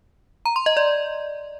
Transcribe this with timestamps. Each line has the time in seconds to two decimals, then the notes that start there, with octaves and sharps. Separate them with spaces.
0.46 A#5
0.56 C6
0.66 D#5
0.77 D5